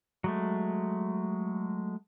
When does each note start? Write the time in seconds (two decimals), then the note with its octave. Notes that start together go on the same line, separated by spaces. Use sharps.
0.24 F#3 G#3 A3